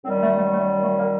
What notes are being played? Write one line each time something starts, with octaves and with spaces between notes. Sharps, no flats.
F#2 D#3 G3 C4
A3
A3
A3
A3
A#3